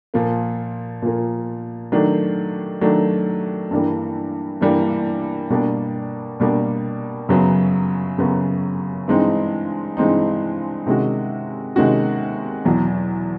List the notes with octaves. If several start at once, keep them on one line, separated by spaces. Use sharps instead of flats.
A#2 F3 A#3
A#2 F3 A#3
D#3 F#3 A3 D4
D#3 F#3 A3 D4
G2 E3 G3 A#3
G2 E3 G3 A#3
B2 G3 A#3 D4
B2 G3 A#3 D4
F#2 C#3 F#3 B3
F#2 C#3 F#3 B3
G2 E3 G#3 C4 D#4
G2 E3 G#3 C4 D#4
C3 D#3 G#3 C#4 F#4
C3 D#3 G#3 C#4 F#4
E2 B2 F#3